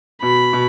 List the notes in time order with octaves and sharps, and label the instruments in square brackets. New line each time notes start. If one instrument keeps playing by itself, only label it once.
[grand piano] B2 [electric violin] B5
[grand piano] B2